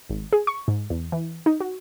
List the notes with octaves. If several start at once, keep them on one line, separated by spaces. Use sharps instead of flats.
G#1
G#4
C#6
G#2
E2
E3
D#4
F#4